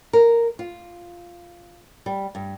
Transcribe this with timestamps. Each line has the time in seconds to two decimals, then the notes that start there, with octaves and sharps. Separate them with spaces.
0.13 A#4
0.59 F4
2.06 G3
2.35 G2